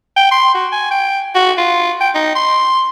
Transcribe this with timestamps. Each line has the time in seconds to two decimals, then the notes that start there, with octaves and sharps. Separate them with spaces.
0.17 G5
0.31 C6
0.55 F#4
0.72 G#5
0.91 G5
1.35 F#4
1.57 F4
2.01 G5
2.14 D#4
2.35 C6